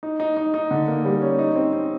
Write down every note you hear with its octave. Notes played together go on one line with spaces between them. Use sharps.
D#4
D#4
D#4
D#4
D3
A#3
G3
C#4
D#4
C4
C4